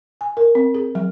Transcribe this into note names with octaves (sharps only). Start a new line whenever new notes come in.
G#5
A#4
C4
G#4
F#3